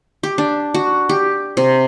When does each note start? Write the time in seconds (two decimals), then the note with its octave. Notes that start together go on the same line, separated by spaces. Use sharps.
0.23 G4
0.38 D4
0.74 F#4
1.09 G4
1.57 C3